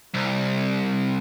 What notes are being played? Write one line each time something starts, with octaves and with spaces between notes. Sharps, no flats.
C2